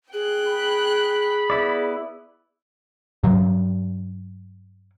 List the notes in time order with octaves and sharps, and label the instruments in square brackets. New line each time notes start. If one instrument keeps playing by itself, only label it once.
[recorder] G#4 [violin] G5 F#6
[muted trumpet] B5
[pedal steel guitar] B3 E4 D5
[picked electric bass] G2 F#3